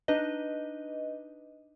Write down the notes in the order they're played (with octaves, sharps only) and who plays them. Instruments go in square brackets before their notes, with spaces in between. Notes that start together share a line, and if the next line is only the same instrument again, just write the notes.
[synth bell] D4 D#4 B4 D#5